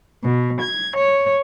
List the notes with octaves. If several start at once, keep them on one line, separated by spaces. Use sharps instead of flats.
B2
G#6
C#5